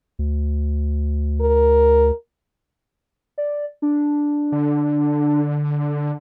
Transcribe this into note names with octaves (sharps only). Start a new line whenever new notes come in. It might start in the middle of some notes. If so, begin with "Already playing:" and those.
D2
A#4
D5
D4
D3